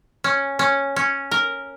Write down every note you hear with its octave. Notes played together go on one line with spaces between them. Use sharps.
C#4
C#4
C#4
A#4